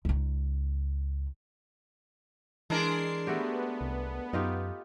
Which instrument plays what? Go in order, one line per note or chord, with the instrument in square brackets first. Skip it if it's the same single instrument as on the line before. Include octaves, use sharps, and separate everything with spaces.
[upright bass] C#2 D#4
[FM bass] E3 [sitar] G#3 D4 A#4 [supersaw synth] C7
[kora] A3 F#4 G4 [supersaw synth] B3
[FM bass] C2
[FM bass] F#2 [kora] D#4 F4 G4